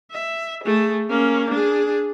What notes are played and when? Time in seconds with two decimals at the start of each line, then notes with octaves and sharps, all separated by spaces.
0.11 E5
0.64 A3 G#4
1.10 A#3 C#4
1.50 D4 G#4